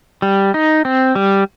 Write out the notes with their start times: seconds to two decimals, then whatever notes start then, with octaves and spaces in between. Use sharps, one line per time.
0.22 G3
0.54 D#4
0.85 C4
1.15 G3